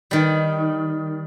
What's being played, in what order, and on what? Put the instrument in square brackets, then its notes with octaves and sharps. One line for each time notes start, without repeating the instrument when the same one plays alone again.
[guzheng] D#3 G3